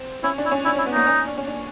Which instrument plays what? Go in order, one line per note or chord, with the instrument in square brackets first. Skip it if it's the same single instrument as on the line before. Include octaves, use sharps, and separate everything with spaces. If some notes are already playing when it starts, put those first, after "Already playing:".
Already playing: [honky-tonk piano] C4
[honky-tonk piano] C#4 [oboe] E4
[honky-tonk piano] D4
[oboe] E4
[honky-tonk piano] C#4
[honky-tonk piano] D4 [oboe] E4
[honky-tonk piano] C#4 [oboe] E4
[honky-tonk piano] B3
[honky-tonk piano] A#3 [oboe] D#4
[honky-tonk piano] C#4
D4
C#4
D4